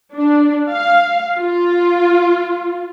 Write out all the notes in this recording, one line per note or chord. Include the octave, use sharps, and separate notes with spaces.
D4
F5
F4